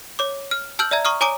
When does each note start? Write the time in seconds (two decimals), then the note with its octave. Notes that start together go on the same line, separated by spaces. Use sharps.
0.19 C#5 D6
0.51 F6
0.79 A5 E6 F6 G6 F#7
0.91 D5 E5 A#5 G#6
1.05 A#5 C#6 D#6 F6
1.21 C#5 G#5 A#5 D6 D#6 D7